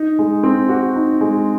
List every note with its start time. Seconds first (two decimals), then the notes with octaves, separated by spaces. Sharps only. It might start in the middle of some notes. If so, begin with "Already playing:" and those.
Already playing: D#4
0.19 G#3
0.43 C4
0.69 F#4
0.96 D#4
1.21 G#3